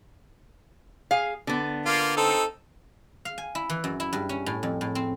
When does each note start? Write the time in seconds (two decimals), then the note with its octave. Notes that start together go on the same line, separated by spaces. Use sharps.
1.11 G#4 F5
1.47 D3 B3
1.86 A#3 F4
2.17 C4 D#4 A4
3.25 F5
3.38 G#5
3.55 E4
3.70 E3
3.84 F#2
4.00 E4
4.13 G2
4.29 C#4
4.46 A2
4.63 F2
4.81 A2
4.95 C4